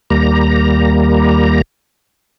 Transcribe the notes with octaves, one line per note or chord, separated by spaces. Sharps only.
D#2 G3 A#3 A#5